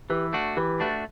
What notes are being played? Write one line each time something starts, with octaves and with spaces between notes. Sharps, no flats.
E3 G4 B4
A3 D4 F#4
E3 G4 B4
A3 D4 F#4